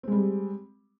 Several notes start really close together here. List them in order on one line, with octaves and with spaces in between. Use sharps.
C4 G#3 G3